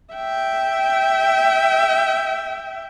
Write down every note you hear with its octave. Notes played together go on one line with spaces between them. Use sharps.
E5 G5